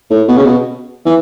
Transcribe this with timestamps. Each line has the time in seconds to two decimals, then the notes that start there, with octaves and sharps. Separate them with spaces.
0.11 A2
0.28 B2
0.37 C#3
0.45 B2
1.06 E3